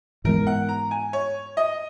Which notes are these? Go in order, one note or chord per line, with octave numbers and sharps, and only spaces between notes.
G#2 E3 G#3 B3 A#4
F#5
A#5
G#5
C#5
D#5